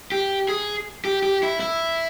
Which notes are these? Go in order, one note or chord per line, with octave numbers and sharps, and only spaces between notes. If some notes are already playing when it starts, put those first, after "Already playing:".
G4
G#4
G4
G4
E4
E4